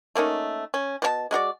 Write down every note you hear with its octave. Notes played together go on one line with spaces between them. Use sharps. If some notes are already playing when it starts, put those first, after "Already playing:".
A3 A#3 C#4 D#4
C#4
B2 C#4 A5
G#3 A3 F#4 D5